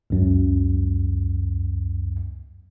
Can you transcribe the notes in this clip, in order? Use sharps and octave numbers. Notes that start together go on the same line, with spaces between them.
C#2 F#2